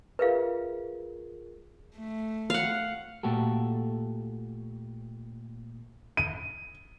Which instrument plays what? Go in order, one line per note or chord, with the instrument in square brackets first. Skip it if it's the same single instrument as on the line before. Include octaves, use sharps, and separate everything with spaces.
[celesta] F4 G#4 A#4 [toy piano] B4 E5 F5
[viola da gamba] A3
[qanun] F5 F#5
[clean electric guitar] A#2 A3 F#4 G4 A4
[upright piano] D#7